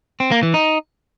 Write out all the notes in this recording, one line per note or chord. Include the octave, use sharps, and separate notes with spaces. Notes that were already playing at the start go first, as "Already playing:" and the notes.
C4
A#3
E3
D#4